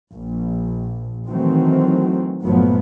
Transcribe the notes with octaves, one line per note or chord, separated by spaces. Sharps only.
A#1
D#3 E3 F#3 A3 C4
G1 A#2 F3 F#3 A3 B3